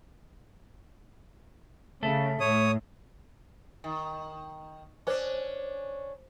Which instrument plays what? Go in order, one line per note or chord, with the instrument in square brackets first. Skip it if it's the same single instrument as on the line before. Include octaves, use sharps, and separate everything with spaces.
[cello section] C#3 [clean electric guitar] A3 A4
[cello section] A2 [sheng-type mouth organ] C#5 D#6
[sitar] D#3
[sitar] C#4 D4 [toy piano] C5 D6